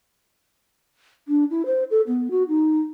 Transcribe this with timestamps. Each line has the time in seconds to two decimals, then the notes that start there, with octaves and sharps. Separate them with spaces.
1.28 D4
1.51 E4
1.66 C5
1.91 A4
2.07 B3
2.31 F#4
2.48 D#4